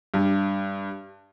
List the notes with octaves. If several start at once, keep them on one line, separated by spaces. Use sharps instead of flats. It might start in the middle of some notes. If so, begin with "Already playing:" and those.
G2